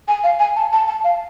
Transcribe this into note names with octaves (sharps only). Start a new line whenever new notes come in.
G#5
F5
G#5
A5
A5
A5
F5